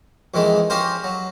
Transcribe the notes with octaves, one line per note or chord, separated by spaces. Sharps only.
F2 D#3 E3 G#3
C#4 F4 G4 A#4 C5
F#3